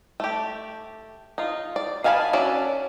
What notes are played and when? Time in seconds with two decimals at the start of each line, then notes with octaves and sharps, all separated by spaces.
0.20 A3 G4
1.38 D#4 F4
1.76 D5
2.04 D#3 F5 G#5 A5 B5
2.33 C#4 D4 F#4 D5 E5